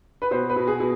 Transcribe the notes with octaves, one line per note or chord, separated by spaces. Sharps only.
B4
B2 C5
B4
B2
G#4
B2